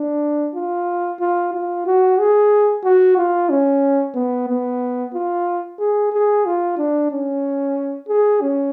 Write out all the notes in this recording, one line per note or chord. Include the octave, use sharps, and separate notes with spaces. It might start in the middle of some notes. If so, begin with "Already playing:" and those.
Already playing: D4
F4
F4
F4
F#4
G#4
F#4
F4
C#4
B3
B3
F4
G#4
G#4
F4
D4
C#4
G#4
C#4